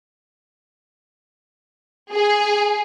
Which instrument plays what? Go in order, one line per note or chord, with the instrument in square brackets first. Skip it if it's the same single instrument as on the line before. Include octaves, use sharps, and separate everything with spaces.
[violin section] G#4